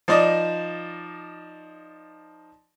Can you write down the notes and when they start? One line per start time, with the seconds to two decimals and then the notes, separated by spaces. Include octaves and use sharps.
0.08 F3 D#4 D5 D#5